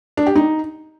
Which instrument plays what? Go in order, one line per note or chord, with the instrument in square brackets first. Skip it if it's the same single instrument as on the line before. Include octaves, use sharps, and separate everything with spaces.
[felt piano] D4
G4
D#4